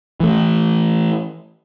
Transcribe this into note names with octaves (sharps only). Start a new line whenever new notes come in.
E3 A3